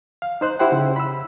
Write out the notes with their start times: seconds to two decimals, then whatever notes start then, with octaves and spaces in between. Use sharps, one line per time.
0.22 F5
0.41 D#4 C5 F#6
0.59 E4 G4 C5 F#5 G5
0.72 C#3
0.96 B5 E6